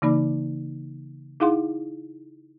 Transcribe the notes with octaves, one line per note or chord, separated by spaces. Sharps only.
C#3 E3 A#3 D#4 D5 B5
D#4 E4 G#4 F5 F#5 C6